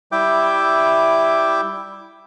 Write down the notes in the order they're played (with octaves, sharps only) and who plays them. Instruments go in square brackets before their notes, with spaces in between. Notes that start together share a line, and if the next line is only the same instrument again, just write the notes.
[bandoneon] G3 E4 E5 G5 D6 G6